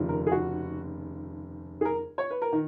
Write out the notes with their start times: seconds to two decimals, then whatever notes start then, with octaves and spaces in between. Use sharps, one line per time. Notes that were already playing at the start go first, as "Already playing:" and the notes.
Already playing: F1 D#2 C#3 F3
0.09 A#4
0.27 G#4
0.32 F#4
1.81 G#4
1.85 A#4
2.18 C#5
2.30 B4
2.42 A#4
2.52 D#3